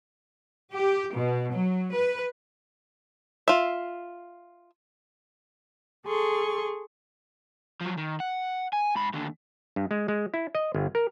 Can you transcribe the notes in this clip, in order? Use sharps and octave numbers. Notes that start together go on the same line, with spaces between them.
G4
B2
F#3
B4
F4 E5
G#4 A4 C6 C#6
F3 F#3
D#3
F#5
G#5
G#2 B5
D#2 D3
G2
G#3
G#3
E4
D#5
G1
A#4